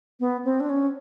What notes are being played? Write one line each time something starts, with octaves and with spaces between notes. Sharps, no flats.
B3
C4
D4
C#4